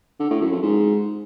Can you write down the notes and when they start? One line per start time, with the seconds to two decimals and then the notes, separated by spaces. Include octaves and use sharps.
0.20 D3
0.30 A2
0.41 F#2
0.52 F2
0.62 G#2